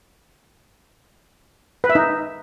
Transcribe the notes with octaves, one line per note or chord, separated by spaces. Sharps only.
B4
E5
D#4